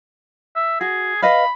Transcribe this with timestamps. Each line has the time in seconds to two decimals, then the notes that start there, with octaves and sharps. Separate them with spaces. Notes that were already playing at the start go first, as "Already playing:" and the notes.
0.56 E5
0.81 F#4 G#4
1.22 B4 D#5 F5 B5